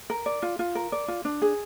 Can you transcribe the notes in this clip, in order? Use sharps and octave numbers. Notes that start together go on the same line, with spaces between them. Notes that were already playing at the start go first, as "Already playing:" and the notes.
A#4
D5
F4
F4
A#4
D5
F4
D4
G#4